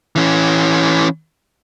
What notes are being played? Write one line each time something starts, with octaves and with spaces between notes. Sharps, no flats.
E3 C#4